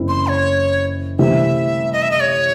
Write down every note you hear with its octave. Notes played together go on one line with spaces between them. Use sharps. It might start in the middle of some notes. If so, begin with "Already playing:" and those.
Already playing: F#1 F#2 E3 C4 E4
C6
C#5
C2 C3 E3 A3 C4 E5
D#5
E5
D#5
C#5